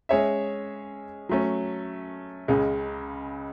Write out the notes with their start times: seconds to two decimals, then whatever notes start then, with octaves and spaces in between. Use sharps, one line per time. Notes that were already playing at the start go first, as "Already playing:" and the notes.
0.09 G#3 C#4 G#4 C#5 E5
1.29 F#3 A3 C#4
2.48 C#2 C#3 G#3